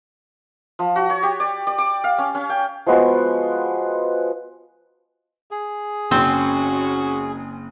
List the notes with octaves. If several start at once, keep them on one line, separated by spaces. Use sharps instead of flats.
F3
F#4
C#5
G4
D5
D5
D6
F5
C#4
C#4
G5
F3 G#3 B3 F#4
G#4
F#1 C#3 C4 C#4 F#4